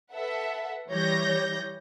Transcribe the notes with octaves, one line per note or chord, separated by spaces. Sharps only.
A4 B4 E5 F#5
E3 G3 C#5 G6 A#6